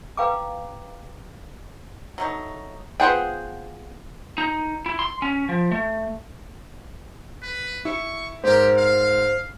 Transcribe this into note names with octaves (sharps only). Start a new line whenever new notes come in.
B4 F5 G5 A#5 D6
F#3 A3 D#4
B3 F4 G#4 C5 F#5 G5
D#4
E4
C6
C#4
F3
A3
B4
E4 C#6
G#2 G4 A#4 C5
F5